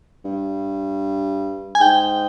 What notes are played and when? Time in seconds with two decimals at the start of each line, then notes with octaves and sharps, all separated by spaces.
0.25 G2
1.75 G#5
1.81 G#2 G5